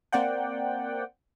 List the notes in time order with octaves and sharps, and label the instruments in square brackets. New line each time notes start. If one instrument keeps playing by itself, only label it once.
[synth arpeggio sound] A#3 C4 D5 F#5 G5